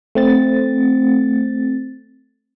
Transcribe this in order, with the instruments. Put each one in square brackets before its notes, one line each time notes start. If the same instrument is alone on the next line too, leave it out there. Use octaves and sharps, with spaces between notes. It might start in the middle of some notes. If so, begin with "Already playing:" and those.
[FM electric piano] A3 C4 A6